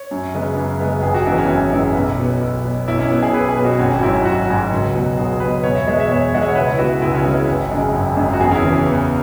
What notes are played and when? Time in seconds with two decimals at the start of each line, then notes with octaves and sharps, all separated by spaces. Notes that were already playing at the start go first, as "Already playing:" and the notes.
Already playing: C#5
0.11 F#2
0.34 C#3 G#3 B3
0.57 F#2
0.80 C#3 G#3 B3
1.03 G#1 G#4
1.14 F#4
1.26 F#2 E3 G#3 B3 E4
1.38 C#4
1.49 G#1 C#4
1.72 F#2 E3 G#3 B3 E4
1.95 B1
2.18 B2 B3
2.41 B1
2.64 B2 B3
2.88 B1 E4
2.99 C#4
3.10 B2 B3 E4
3.22 G#4
3.33 B1 B4
3.49 G#4
3.56 B2 B3
3.64 F#4
3.79 G#1 C#4
3.94 F#4
4.02 G#2 F#3 E4
4.25 G#1 F#4
4.48 G#2 F#3
4.71 C#2
4.95 B2 F#3
5.18 C#2 G#4
5.40 B2 F#3 B4
5.63 E2 C#5
5.75 E5
5.86 B2 G#3 B3 C#5
6.00 E5
6.09 E2 C#5
6.33 B2 G#3 B3 F#5
6.42 E5
6.48 C#5
6.55 C#2 B4
6.74 E4
6.79 C#3 G#3 B3 F#4
7.01 C#2 E4
7.15 C#4
7.24 C#3 G#3 B3 E4
7.48 G#1
7.71 F#2 C#3 G#3
7.94 G#1
8.16 F#2 C#3 G#3
8.33 F#4
8.40 E2 G#4
8.51 C#4
8.55 E4
8.63 C#3 E3 B3
8.86 E2